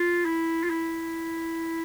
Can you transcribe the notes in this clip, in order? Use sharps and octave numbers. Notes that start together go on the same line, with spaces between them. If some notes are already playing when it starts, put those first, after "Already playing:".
Already playing: F4
E4
F4
E4